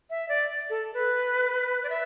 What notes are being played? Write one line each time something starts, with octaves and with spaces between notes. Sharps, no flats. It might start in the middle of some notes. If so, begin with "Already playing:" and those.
E5
D5
A4
B4
D5
E5